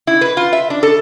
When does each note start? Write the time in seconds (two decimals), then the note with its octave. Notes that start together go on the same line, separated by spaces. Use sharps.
0.07 E4
0.21 B4
0.37 F4
0.53 E5
0.70 D4
0.83 A4